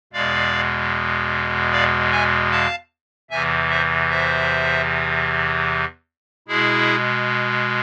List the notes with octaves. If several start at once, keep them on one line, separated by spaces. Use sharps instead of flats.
E2 B2 G#3 D5 F5
D5 F5
E5 G#5
F5 A5
E2 C3 E3 E5 G#5
C5 E5
C5 E5
B2 G#3 E4 G#4